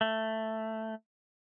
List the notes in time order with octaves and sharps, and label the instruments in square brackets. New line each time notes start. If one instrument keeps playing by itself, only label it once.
[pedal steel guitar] A3